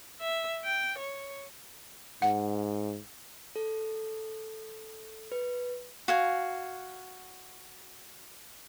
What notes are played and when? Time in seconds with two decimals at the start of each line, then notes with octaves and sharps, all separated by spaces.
0.20 E5
0.64 G5
0.98 C#5
2.22 G#2 F#5
3.56 A4
5.32 B4
6.08 F#4 F5 G#5